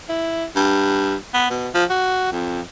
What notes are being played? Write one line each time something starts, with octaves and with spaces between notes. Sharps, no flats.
E4
G2
B3
B2
F3
F#4
F2